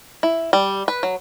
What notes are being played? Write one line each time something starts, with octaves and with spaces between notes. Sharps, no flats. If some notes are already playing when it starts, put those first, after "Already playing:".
E4
G3
B4
F#3